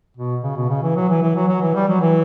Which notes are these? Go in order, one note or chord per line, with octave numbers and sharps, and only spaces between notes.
B2
C#3
B2
C#3
E3
F#3
E3
E3
F#3
F#3
E3
G3
F#3
E3